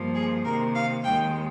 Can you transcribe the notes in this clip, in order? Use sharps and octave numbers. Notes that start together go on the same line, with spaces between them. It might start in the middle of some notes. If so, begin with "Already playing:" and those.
Already playing: G2 F3 A#3
G#4
C3 D#3 A#3 A#4
F5
D#2 D#3 G#3 G5